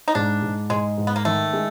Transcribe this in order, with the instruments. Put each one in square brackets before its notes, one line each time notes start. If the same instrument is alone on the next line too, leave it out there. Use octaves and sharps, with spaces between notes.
[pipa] D#4
[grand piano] G#2 [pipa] D4
[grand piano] G#2
[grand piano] G#2 [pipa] G#3
[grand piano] G#2
[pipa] B3
A#3
[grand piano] D#3 [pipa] A3
[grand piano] G#3